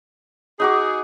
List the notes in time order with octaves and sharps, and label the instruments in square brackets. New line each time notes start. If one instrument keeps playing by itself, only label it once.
[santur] D#4 F#4 D6 [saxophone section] G#4